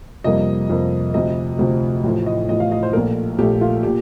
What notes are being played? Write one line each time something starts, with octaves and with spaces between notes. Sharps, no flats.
F2 C3 G3 A#3 D#5
F2 C3 G3 A#3
D2 C3 F3 D#5
D2 C3 F3
A1 A2 F3
D#5
A1 A2 F3 D#5
F5
D#5
C5
A#1 A#2 A3 A#4
A#1 A#2 A3 G4
F4
A#2 G4